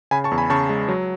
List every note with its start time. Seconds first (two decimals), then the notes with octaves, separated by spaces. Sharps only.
0.11 C#3 G#5 B5
0.24 A5 C#6
0.31 E2
0.38 G#5 B5
0.50 C#3 A5 C#6
0.69 G#3
0.88 F#3